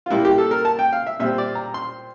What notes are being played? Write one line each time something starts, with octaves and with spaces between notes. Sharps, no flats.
F4
A#2 G3 A#3 E4
G4
A4
A#4
A5
G5
F5
E5
A#2 G3 C4 E5
D5
A#5
C6